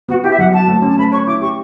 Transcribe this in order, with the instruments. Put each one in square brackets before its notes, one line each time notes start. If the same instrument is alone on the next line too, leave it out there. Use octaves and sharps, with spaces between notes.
[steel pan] B3 [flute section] F#4
[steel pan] E4 [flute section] G4
[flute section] E5
[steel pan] F#3 [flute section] F#5
[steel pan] F#4 [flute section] A5
[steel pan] A3
C#4
[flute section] A5
[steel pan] A3 [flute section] B5
[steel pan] C#5 [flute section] C#6
[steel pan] E4 [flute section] D6
[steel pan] G4 [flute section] C#6